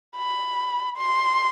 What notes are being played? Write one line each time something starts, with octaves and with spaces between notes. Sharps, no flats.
B5
C6